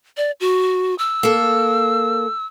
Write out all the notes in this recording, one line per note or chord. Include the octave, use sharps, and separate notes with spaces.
D5
F#4
E6
A#3 A4